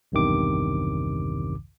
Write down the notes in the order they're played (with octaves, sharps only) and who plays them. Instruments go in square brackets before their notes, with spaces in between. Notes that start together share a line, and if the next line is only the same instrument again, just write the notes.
[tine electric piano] B1 E2 G2 C3 D#3 D6